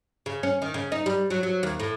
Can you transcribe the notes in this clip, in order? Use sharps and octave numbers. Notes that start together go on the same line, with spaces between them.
C#3
C#4
D#3
C#3
D#4
G3
F#3
F#3
D#2
A2